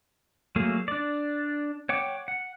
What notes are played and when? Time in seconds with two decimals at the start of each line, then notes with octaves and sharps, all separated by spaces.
0.56 F#3 A3 A#3 G#4
0.88 D4 D5
1.89 C#5 F#5 G5 D6
2.28 F#5